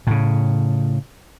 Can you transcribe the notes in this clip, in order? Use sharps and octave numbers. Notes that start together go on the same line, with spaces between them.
A2 C#3